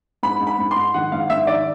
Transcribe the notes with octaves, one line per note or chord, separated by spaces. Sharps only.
G#2 B5
G#2
B5
G#2
C6
G#2
D#3 F#5
G#2 F5
G#2 E5
D#3 D5